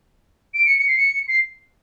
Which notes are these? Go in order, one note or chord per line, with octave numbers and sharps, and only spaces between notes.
D7
C#7
C#7
C7
C#7
C7